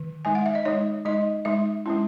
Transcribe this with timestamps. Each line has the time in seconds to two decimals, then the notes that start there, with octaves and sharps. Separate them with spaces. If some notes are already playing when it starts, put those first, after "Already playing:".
Already playing: D#3
0.25 G#3 D#4 G#5
0.35 F#5
0.46 E5
0.55 D#5
0.65 G#3 D#4 C#5
1.05 G#3 D#4 D#5
1.45 G#3 D#4 E5
1.86 G#3 C#4 E4